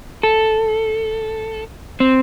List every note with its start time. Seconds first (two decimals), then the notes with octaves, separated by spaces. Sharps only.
0.23 A4
2.00 C4